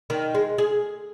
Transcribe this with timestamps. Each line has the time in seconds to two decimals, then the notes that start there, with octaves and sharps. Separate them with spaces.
0.10 D#3
0.35 G#3
0.58 G#4